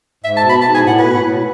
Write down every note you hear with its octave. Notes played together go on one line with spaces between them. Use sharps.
G#2 E5
A5
B2
B5
G#2 A5
G#5
A2
F#5
B2 B4
A2
A2